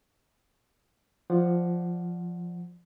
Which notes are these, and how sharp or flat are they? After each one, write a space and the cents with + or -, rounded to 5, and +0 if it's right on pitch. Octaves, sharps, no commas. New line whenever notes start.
F3 +0 D5 +0 F#5 +0